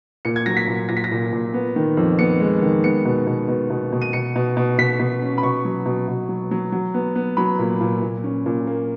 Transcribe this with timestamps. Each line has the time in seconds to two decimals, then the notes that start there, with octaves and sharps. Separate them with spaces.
0.25 A#2 C#7
0.36 G#6
0.46 F#3 A#6
0.57 B6
0.68 A#2
0.89 A#2 A#6
0.97 B6
1.04 A#6
1.12 A#2
1.32 A#2
1.54 B3
1.76 D#3
1.97 F2
2.19 B3 C#7
2.40 G#3
2.62 D#3
2.84 B3 C#7
3.05 B2
3.27 B2
3.48 B2
3.70 B2
3.92 B2
4.02 D#7
4.13 B2 C#7
4.36 B2
4.57 B2
4.78 B2 B6
4.99 B2
5.22 C#4
5.38 B5
5.43 B2 C#6
5.65 F#3
5.86 B2
6.08 B2
6.29 F#3
6.51 F#3
6.72 F#3
6.94 B3
7.15 B3
7.37 F#3 B5
7.59 A#2
7.81 A#2
8.03 A#2
8.24 C#4
8.46 A#2
8.67 A#3